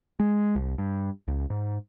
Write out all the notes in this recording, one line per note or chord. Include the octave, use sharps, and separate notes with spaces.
G#3
C2
G2
C#2
G#2